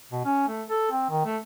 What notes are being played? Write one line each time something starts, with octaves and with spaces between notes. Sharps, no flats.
B2
C#4
A3
A4
C4
D#3
A3